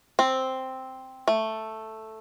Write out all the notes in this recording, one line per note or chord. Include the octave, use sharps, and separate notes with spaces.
C4
A3